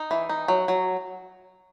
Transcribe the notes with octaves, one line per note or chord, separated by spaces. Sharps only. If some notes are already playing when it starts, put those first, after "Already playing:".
Already playing: D#4
E3
D#4
F#3
F#3